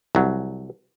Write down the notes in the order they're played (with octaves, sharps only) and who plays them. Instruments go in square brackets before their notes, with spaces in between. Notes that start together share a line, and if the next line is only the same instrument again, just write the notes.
[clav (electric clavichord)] C2 F#3